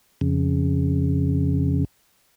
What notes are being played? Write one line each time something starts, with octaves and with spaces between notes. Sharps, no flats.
F2 C#3